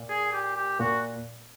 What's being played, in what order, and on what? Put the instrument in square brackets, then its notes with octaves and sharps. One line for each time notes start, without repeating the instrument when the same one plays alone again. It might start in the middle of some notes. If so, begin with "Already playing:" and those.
Already playing: [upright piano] A#2
[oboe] G#4
G4
G4
[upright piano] A#2 A#3 [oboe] F#4